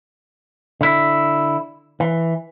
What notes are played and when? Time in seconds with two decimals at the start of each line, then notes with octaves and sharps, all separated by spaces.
0.81 D3 E4
2.00 E3